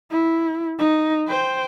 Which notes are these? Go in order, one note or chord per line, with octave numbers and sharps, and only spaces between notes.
E4
D#4
C5 G5